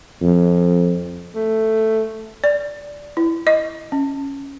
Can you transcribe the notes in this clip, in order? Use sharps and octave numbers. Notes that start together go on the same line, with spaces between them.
F2
A3
D5
E4
D#5
C#4